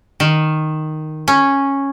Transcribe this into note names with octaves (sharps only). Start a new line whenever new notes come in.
D#3
C#4